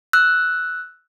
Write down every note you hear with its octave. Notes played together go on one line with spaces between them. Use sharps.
E6 F#6